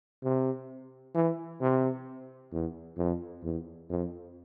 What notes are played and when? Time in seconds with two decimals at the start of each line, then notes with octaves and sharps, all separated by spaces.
0.23 C3
1.15 E3
1.61 C3
2.52 E2
2.98 F2
3.43 E2
3.89 F2